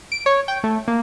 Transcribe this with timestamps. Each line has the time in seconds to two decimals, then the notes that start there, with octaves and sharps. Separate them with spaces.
0.12 D7
0.26 C#5
0.48 G5
0.64 A3
0.88 A#3